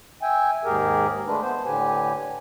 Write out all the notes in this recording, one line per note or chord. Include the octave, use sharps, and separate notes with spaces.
E5 G5 G#5
D#2 G#2 G4 G#4 A#4
G#3 A3 D4 B4
B3 C5
A2 D3 G4 B4 G#5